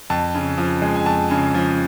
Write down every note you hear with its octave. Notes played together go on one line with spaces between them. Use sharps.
F2 A5
C#3
F3
G#3
G#5
F2 A5
C#3
F3